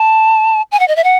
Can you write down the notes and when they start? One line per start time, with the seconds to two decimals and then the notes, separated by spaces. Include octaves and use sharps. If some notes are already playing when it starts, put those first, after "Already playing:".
Already playing: A5
0.72 G#5
0.80 F#5
0.88 D#5
0.96 E5
1.04 F#5